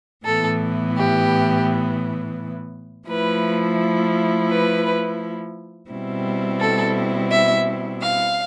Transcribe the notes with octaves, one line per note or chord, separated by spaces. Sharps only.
A2 E3 B3 A4
G4
F3 A3 E4 B4
B4
B2 G3 C4 E4
A4
E5
F5